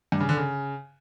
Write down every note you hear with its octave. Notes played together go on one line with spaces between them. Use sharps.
G2
C#3
D3
C#3